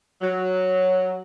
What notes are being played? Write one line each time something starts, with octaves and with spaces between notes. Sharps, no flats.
F#3